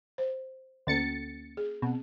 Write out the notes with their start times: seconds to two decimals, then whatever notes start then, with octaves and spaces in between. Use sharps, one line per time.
0.18 C5
0.87 D2 A#3 C#4 A4 A6 C#7
1.57 G#4
1.82 B2 C4